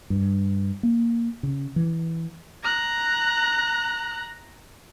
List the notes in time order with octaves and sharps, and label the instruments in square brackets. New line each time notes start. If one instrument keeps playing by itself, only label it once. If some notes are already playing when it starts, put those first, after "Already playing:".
[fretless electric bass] G2
A#3
C#3
E3
[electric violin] A#5 F#6